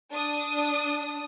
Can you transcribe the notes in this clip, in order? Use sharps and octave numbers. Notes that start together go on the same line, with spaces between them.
D4 D#6